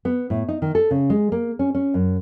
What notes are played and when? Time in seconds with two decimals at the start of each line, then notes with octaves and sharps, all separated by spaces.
0.05 B3
0.30 A2
0.49 D#4
0.62 D#3
0.75 A4
0.91 C#3
1.10 G#3
1.32 A#3
1.59 C#4
1.75 C#4
1.94 F#2